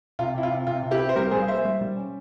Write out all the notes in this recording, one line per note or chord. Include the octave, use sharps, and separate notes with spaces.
C3 F4
C3 E4
F4
C3
C3 F4
C3
E4 G4
C4
C5
G3 G4 A#4
G3 G#4 C5
F5
A#3 C5 E5
G3
G3
C#4